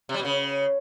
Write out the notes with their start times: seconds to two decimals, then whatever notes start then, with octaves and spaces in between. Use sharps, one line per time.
0.09 C3
0.14 G3
0.20 B2
0.25 C#3